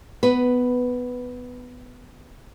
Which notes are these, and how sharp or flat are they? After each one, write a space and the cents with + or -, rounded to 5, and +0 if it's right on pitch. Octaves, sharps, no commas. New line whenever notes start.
B3 +10 B4 +0